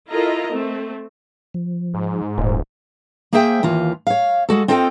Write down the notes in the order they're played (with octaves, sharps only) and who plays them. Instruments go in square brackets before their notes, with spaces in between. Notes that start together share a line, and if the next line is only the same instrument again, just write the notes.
[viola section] E4 F4 A4 A#4 D#5 A#5
A3 C4
[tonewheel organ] F3
[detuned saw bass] G#2
[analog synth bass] D#1 [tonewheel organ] C5
[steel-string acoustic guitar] A#3 G#4 C5 E5 G5
D#2 E3 F4
C#5 F5
G#3 F#4 A4
C4 F4 A4 D#5 F5 G5